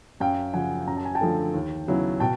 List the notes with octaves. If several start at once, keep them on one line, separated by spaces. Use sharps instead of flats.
F#2 F5 G5
C#3 F3 F#5 G#5
F#2 A#5
A5
G#5
G5 A5
D3 F3 A3
D#2
C#3 F#3 B3 E4
B2 G5 A5